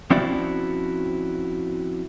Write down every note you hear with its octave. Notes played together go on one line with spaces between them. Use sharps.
F3 C4 C#4 E4 F#4 D5